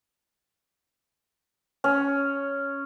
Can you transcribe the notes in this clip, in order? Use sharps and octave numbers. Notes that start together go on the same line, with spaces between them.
C#4